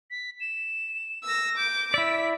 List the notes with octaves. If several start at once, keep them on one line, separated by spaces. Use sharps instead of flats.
B6
E7
E6 A#6
D6 G6
E4 D5 E6 B6